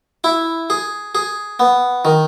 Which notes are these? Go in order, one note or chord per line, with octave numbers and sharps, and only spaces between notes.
E4
G#4
G#4
B3
D#3